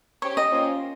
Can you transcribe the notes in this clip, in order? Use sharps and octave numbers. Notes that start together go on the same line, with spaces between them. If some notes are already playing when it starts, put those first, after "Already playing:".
C#4 G4 C5 C#5 G5
D#5
A#3 C#4 F4 C5